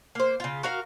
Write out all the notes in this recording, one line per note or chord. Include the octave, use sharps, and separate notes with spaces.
A#3 C5
C#3 F4
F#4 A#4 F5